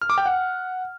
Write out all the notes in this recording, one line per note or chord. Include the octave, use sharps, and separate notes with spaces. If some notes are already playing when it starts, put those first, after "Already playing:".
F6
D6
G5
F#5